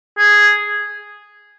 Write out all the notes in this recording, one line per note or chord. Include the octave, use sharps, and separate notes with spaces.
G#4